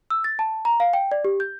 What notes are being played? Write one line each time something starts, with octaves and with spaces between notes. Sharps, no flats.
E6
A6
A5
A#5
F5
G5
D5
G4
G6